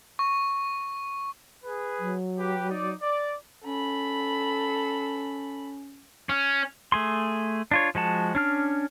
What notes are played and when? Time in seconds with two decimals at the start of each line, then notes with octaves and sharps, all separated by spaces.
0.19 C#6
1.64 G#4 B4
1.99 F#3
2.38 G4 B4
2.70 D#4 D5
3.02 D5
3.65 C#4 A4 B5
6.29 C#4
6.92 A3 G#4 C6
7.71 D4 F4 C#5
7.95 F3 G#3 F#4 A5
8.35 C#4 D4 F6